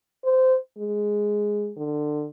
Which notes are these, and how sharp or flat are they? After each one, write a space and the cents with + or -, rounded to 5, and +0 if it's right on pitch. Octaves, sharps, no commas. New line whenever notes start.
C5 -15
G#3 +0
D3 +25